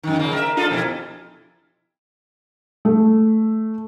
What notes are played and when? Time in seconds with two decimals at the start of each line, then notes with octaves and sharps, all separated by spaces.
0.03 F#2 D#3
0.19 A#2 C#3 A#3
0.33 A#4 D5 E5
0.57 D4 F4 A4
0.69 F2 B2 E4
2.85 A3